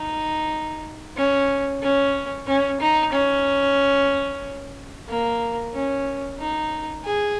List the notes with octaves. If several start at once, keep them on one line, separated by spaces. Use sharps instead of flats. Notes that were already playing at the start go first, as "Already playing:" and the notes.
Already playing: D#4
C#4
C#4
C#4
D#4
C#4
A#3
C#4
D#4
G#4